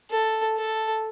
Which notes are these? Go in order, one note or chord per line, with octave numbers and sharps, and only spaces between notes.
A4
A4